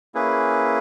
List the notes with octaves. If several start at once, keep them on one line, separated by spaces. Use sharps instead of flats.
A#3 C#4 E4 G#4 B4